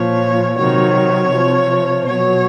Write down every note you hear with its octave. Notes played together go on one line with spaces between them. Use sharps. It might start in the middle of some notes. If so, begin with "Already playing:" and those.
Already playing: A#2 F3 C#5
C3 D#3 F#3 C#5
C3 F3
B2 F#3 C#5